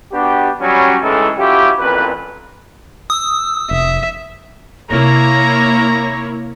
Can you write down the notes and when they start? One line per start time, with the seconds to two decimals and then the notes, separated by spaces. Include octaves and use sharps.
0.11 B3 D4 F#4 G4
0.61 F#3 G3 C#4
1.02 A2 C#3 E3 G#3 D#4 A4
1.38 F#3 C#4 E4 F4 G4
1.80 A1 F2 A#2 B4
3.10 D#6 E6
3.71 F1 E5
4.91 C3 A#3 C4 E4 C#5 A#5 A#6